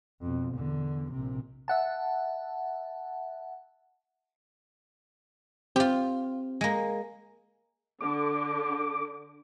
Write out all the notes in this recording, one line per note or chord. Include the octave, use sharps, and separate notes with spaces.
F2 B2
E2 D3
A#1 C3
E5 F#5 A5
C4 F4 G4
G#3 A#3
D3 D6